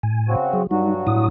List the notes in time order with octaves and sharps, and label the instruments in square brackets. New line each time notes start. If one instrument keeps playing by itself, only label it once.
[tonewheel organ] A2 G#5
[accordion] C#3 C4 F#4
[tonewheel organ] F#3 G#4
[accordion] G2 F#3 F#4 [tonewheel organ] G3 D#4
[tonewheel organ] A2 E4 D#6